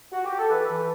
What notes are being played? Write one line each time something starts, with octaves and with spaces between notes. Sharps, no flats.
F#4
G4
A4
E3 B4
E3